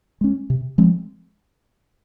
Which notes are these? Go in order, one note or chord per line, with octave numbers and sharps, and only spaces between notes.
G#3 C#4
C3
F3 G#3 C4